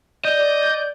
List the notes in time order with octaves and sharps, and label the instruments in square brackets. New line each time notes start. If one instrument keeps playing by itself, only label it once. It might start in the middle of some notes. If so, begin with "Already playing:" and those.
[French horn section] D5 [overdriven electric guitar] D#5 [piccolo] G6